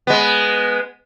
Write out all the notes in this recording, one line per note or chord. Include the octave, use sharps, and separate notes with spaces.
G#3 B3